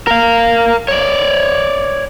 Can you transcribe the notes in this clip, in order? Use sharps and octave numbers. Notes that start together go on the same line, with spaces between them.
A#4 F5
C#5 D5